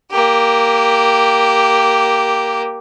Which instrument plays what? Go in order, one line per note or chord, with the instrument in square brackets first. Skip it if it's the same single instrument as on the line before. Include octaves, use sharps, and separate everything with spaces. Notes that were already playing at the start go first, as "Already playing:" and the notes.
[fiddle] A#3 G4